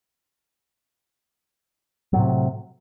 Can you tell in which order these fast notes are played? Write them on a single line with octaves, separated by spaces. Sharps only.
F#3 A2 C3